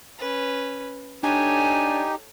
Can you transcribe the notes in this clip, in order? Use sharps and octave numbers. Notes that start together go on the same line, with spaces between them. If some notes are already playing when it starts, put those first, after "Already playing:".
C#4 B4
D4 D#4 G4 A4 C#5 G#5